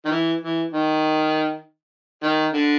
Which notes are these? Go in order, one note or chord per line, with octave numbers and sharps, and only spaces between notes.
D#3
E3
E3
D#3
D#3
D3